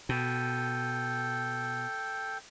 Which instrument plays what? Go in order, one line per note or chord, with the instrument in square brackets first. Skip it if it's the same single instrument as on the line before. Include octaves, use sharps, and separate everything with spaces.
[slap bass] B2 [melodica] A4 G5